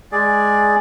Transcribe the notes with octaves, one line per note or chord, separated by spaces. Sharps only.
G#3 G#4 D5